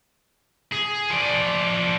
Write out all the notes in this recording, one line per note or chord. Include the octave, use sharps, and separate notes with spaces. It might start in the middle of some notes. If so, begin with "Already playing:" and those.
G#4
F3 D5